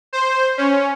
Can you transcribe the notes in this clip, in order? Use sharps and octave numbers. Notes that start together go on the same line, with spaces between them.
C5
C#4